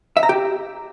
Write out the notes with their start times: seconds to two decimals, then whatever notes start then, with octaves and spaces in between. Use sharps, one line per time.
0.17 E5
0.23 A#5
0.29 G4